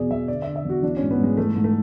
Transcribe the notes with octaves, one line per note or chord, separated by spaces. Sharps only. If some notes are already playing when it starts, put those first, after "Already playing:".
Already playing: E2 B2 G#4 D5
E2 E5
D3 D5
E5
D3
E5
E2 F#4
E3 D4
C#4
G#2
B3
G#2 G#3
E3 A3
G#2
A3